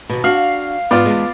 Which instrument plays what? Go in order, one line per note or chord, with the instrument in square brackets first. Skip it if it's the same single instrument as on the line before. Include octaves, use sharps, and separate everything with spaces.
[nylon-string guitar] D#2 B2
[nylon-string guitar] D4 F#4 [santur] F5
[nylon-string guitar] G#2 [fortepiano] B3 F4 [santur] D5
[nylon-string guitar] E2 G#3